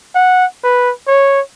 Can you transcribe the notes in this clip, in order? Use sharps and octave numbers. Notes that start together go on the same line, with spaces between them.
F#5
B4
C#5